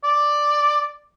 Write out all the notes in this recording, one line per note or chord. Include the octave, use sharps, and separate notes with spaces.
D5